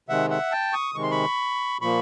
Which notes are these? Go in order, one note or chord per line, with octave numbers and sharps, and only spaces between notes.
C3 D#3 G#3 E5 F#5
E5 F#5
G5 A5
C#6 D#6
C3 D#3 G#3 C#6
C6
B5 C#6
A#2 F3 A#3 B5 C#6